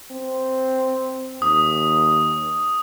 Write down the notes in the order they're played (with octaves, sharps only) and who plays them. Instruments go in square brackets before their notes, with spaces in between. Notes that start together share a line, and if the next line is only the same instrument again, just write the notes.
[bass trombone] C4
[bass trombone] D#2 [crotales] D#6